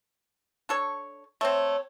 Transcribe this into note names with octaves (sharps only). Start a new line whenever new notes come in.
D4 A4 C#5
A3 C4 C#5